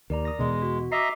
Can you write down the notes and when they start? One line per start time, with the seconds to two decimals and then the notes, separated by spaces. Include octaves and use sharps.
0.10 D#2 A#4 D5 A#5
0.25 D#6 A#6
0.39 E2 B2 G#3
0.62 F#4
0.92 D#5 E5 A#5 D6 C7